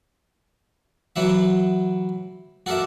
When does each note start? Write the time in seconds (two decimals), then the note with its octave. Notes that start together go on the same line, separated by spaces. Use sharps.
1.16 E3 F#3 F#4 E5
2.66 F#4 A4 A#4 D5 E5